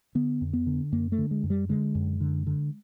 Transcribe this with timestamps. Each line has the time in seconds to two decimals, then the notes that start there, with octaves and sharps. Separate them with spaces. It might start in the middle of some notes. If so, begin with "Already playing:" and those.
0.15 D3 B3
0.41 F2
0.53 B3
0.67 D3
0.92 F#2 A#3
1.12 A3
1.18 D3
1.31 G#3
1.43 F#2
1.50 G3
1.69 D3 G#3
1.95 F#2
2.21 D3
2.47 D3